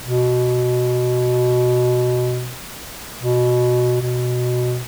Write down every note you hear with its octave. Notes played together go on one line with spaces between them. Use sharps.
B2
B2
B2